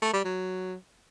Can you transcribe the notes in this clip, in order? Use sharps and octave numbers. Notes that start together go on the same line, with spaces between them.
A3
G3
F#3